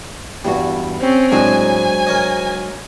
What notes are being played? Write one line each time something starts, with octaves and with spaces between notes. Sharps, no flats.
E2 G2 G3 F#4
C4 C#4 C5
A2 F#3 G#3 D4 G#5
A#4 C#5 D#5